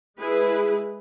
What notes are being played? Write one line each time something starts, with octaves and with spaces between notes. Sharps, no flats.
G#3 E4 G#4 B4